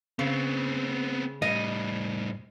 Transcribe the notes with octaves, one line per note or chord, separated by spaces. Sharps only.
C#3 B3 C4
A2 G3 D#5